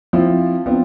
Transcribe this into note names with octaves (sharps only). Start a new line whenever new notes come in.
F3 C4 E4 F4
B3 C4 D4 F4